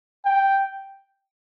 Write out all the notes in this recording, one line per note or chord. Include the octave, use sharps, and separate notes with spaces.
G5